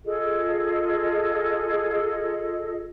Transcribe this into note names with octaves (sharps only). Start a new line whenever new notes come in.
F4 G#4 A4 D#5